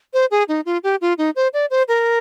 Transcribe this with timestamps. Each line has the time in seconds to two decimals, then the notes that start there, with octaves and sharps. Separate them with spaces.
0.14 C5
0.31 G#4
0.48 D#4
0.66 F4
0.84 G4
1.01 F4
1.18 D#4
1.36 C5
1.53 D5
1.70 C5
1.88 A#4